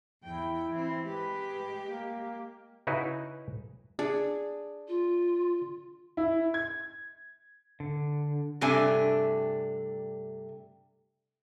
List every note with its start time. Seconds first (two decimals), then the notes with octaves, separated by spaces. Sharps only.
0.24 E2 E4 G5
0.71 E3 C4
1.04 G#3 G4 B4
1.83 A#3
2.87 C#3 D#4 E4 F#4 B4
3.99 D4 G#4
4.87 F4
6.17 E4
6.54 G#6
7.80 D3
8.61 G2 C3 A3 D4 G#5